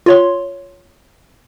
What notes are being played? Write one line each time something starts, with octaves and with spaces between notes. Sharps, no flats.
F4 C#5 C6